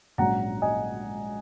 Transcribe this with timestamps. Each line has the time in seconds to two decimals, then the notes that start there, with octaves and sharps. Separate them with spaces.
0.18 A#1 G#2 F#3 C#4 F#5 A#5
0.62 D#5 G#5